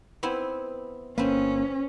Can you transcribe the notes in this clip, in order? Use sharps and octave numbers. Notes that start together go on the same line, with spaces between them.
B3 C4 E4
G1 A#3 C4 C#4 B4